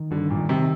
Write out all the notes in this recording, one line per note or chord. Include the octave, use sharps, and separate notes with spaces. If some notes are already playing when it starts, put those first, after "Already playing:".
Already playing: D#3
G2 D3
A#2
D#3
C3